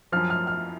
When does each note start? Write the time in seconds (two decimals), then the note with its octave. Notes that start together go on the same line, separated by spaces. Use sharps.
0.12 F#2 F3 F6
0.30 F6
0.47 F6